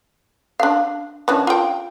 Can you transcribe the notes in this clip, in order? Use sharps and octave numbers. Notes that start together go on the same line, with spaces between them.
D4 F5
E3 C#4 D4
F4 G5